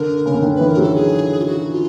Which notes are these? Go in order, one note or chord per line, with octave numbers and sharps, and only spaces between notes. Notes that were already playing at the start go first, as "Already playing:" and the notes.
Already playing: D3 A#4
C#3
D3
D#3
E3 B4
A#4
F#3 A4
G#4
F4
F#4
F4